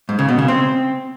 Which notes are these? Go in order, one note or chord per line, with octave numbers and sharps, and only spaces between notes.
G#2
C#3
B2
C#3
C4